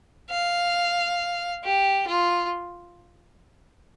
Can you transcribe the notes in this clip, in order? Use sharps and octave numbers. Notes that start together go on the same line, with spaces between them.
F5
G4
F4